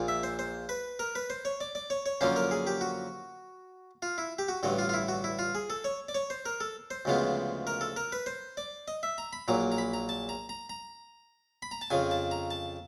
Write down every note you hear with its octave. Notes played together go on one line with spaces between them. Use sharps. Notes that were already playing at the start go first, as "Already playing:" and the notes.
Already playing: A#1 A#2 F3
E5
C5
C5
B4
A#4
B4
C5
C#5
D5
D5
C#5
C#5
F#2 D3 F3 A#3 C#4 C5
A#4
G#4
G4
F#4
F4
E4
G4
F#4
A1 G2 D3 F#4
F4
F4
E4
F#4
E4
F4
G#4
A4
C#5
D5
C#5
C5
A#4
A4
C5
D2 C#3 F3 G#3 B3
A#4
A4
A#4
B4
C5
D5
D#5
E5
A#5
B5
A#1 A#2 F#3 A#5
A#5
B5
A#5
A5
A#5
A#5
A#5
B5
A#5
A5
F2 C#3 F3 G#5
A5
A#5
A5